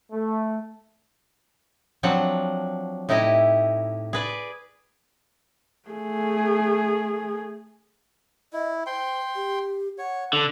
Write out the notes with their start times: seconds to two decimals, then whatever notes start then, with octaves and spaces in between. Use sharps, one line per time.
0.12 A3
2.03 F3 F#3 C4 D4 F#5
3.09 A2 D#4 E4 G4 D#5
4.13 G#4 B4 D5
5.89 A3 G#4
8.53 E4 D#5
8.87 C5 G5 C6
9.36 G4
9.98 C#5 F#5
10.33 D3 A4